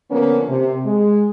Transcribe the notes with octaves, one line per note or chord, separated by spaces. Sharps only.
D3 F3 A#3 B3 C#4
C3
G#3